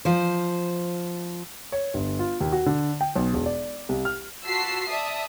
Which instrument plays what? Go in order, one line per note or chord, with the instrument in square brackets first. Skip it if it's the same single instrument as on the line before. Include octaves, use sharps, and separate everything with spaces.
[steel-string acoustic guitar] F3 C5
[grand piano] C#5
G1
F4
D#2
F#4
D3
G5
B1
E1
D5
C2
F6
[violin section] F4 F#4 A5 E6 B6 C7
D5 E5 A5 D#6